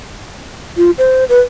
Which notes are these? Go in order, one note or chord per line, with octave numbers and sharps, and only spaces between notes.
F4
C5
B4